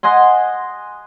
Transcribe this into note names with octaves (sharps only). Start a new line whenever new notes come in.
D#5 F#5 G#5 C6